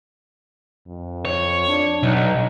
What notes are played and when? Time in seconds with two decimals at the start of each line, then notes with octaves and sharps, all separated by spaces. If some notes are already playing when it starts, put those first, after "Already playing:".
0.87 F2
1.25 C#5
1.69 D4
2.03 B1 D#4